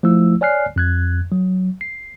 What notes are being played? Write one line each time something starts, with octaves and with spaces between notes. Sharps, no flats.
F3 A3 E4 E6
C#5 D5 G#5 F6 F#6 C7
F2 F#6 G#6
F#3
C7